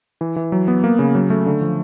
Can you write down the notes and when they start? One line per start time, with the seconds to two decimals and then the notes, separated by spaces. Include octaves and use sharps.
0.21 E3
0.36 E3
0.52 F#3
0.68 B3
0.84 A#3
0.99 C#3
1.15 F#3
1.30 A3
1.46 D3
1.61 F3